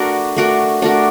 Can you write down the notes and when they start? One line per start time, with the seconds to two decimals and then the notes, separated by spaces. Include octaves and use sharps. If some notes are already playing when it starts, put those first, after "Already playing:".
Already playing: A3 D4 F#4 A#4
0.36 A3 D4 F#4 A#4
0.82 A3 D4 F#4 A#4